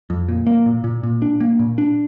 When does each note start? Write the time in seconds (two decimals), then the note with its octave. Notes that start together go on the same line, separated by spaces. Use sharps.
0.10 F2
0.29 A#2
0.47 A#3
0.66 A#2
0.84 A#2
1.03 A#2
1.22 D4
1.40 A#3
1.59 A#2
1.78 D4